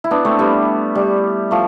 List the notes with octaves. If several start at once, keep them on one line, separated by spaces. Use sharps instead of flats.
E4
B3 D4
A3 C4
G3 B3
G3
F3 A3